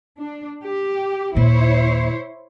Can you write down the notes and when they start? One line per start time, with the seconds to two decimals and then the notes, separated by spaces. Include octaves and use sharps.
0.19 D4
0.65 G4
1.35 D#2 A#2 E4 C5 C#5